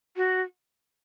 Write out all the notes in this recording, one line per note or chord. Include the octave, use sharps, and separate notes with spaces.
F#4